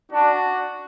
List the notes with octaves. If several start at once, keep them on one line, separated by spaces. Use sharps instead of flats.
D4 F#4